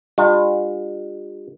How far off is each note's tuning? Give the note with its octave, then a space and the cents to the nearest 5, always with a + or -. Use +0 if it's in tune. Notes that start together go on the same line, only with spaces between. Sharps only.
G3 +45 D4 +45 F4 +35